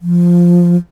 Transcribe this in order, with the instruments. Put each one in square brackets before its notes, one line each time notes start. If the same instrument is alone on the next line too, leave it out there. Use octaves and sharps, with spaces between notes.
[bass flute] F3